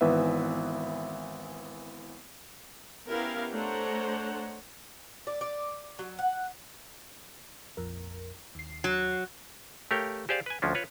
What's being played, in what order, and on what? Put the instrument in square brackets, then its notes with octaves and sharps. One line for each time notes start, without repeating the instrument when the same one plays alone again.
[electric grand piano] G#1 E3 B3 B4 E5
[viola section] B3 C#4 E4 G4 A#4 F5
A3 D4 C5 C#5 F#5 A#5
[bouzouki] D5
D5
F#3
F#5
[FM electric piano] A#1 F2 A#4
D#2 C7
[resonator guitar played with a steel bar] F#3
[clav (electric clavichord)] A3 G4 A#4 C#5 F5 G5
G4 G#4 C5 D5 F5
B4 G#5
D2 F3 C#4 D4
F4 B4 C#5